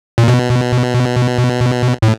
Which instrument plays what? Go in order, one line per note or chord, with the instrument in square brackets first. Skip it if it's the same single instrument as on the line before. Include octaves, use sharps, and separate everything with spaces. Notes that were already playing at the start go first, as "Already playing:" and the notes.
[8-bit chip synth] A#2
B2
A2